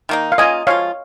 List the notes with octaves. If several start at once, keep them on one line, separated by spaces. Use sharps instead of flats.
D#3 A#3 D#4
F5
A#3 C#4 F4 D#5 G#5
F3 G#3 F4 C#5 F5